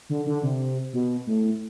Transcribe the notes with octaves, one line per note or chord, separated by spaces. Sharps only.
D3
D3
C3
B2
A2